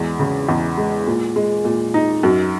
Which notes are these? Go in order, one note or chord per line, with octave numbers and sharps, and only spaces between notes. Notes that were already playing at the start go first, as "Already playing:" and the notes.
Already playing: E2 G#3
C#3
E2
G#3
A#2
G#3
A#2
D#4
F#2